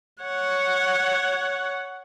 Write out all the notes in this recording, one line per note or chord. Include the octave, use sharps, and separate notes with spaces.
C#5 F#5